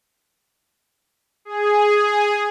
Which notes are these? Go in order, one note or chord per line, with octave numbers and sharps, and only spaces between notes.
G#4